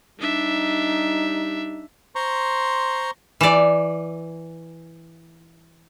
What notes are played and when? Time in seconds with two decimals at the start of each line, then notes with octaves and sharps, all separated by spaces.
0.20 G3 D4 D#4 E5
2.15 C5 A#5 C6 C#6
3.41 E3 D5